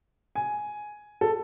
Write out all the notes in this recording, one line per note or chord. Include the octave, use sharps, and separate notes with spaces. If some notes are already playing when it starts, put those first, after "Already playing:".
G#5
A4